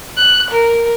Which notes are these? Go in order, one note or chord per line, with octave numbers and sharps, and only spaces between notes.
F#6
A#4